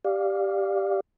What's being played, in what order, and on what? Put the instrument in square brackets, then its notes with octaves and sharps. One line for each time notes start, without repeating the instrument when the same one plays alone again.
[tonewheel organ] G4 D5 F5